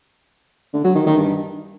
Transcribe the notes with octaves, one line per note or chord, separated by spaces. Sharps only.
D3
F#3
D#3
D#3
G2